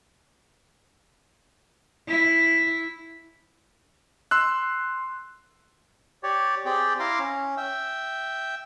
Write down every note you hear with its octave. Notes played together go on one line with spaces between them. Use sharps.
E4
C6 E6 F#6
G4 C#5 D5
C4 G4 G#4 D5 G5
E4 F5 A#5 C6 D6
C#4
E5 G5